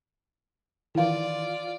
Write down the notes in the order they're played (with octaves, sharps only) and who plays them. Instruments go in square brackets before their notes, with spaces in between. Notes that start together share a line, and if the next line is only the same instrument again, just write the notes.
[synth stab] D#3 E3 [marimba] E4 F5 [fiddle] F4 D5